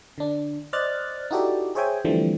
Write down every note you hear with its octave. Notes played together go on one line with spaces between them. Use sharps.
D3 D4
C5 D5 D#5 F6 F#6 A6
D#4 E4 F#4 G4 A4 D5
G#4 C5 C#5 E5 G5 G#5
D3 E3 F3 G3 A3 C4